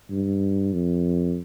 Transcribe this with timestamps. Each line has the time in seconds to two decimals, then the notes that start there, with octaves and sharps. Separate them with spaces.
0.11 G2
0.74 F2